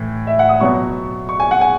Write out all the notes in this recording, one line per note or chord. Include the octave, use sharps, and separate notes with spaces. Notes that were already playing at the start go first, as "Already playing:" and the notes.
Already playing: A2 E3
E5
F#5
D#6
B2 F#3 B3 C#6
C#6
G#5
F#5
G#5